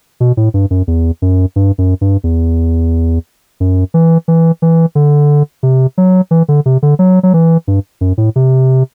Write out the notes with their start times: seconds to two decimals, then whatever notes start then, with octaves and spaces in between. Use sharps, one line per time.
0.20 B2
0.37 A2
0.54 G2
0.71 F#2
0.88 E2
1.22 F#2
1.56 G2
1.78 F#2
2.01 G2
2.24 E2
3.60 F#2
3.94 E3
4.28 E3
4.62 E3
4.95 D3
5.63 C3
5.98 F#3
6.31 E3
6.48 D3
6.66 C3
6.83 D3
6.99 F#3
7.23 F#3
7.34 E3
7.68 G2
8.01 F#2
8.18 A2
8.36 C3